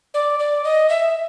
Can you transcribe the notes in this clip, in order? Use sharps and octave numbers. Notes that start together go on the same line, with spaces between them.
D5
D5
D#5
E5